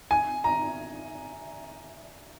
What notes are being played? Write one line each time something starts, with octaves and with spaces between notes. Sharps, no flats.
G#5
A#5